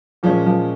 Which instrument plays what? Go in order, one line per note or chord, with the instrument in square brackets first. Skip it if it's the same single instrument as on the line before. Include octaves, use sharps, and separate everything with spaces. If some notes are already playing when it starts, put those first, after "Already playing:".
[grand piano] A#2 G#3 C#4 [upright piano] F3
[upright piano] F3